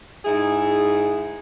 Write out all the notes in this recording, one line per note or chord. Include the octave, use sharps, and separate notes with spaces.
G#2 E4 G#4